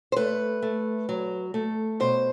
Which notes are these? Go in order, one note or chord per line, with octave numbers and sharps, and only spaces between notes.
C5
A3 B4
A3
F#3
A3
B2 C5